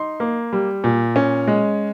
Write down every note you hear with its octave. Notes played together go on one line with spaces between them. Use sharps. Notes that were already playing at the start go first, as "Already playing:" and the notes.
Already playing: D#4 C6
A#3
G3
A#2
C#4
G#3